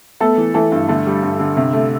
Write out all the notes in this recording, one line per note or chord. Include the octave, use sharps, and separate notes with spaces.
A3 B3 A4
E3
E3 A3 A4
G2
D3 A3 A4
G3
G2
D3
C3
A3